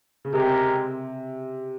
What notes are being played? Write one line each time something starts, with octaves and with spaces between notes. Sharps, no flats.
C#3
C3 G#3 C4 G4 A#4